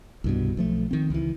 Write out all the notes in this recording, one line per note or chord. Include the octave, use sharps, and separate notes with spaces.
C2 G2 B2
B1 F3 A3
D#3 C4
C#2 E3